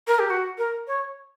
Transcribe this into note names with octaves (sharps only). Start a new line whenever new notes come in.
A#4
G4
F#4
A#4
C#5